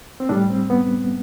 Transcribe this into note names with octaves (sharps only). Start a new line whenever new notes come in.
C4
A2 G3 D4
C4
B3